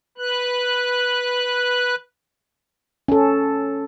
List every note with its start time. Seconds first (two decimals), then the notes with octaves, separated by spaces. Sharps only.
0.18 B4 F#6
3.08 C#4 A4